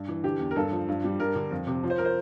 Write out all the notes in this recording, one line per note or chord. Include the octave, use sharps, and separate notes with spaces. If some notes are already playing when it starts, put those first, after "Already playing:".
Already playing: G2
E3
D3 G4
E2
A#4
G2 A4
F3
G2
G3
G2 A#4
D3
F2
C3
F3
C5
F3 A#4
C5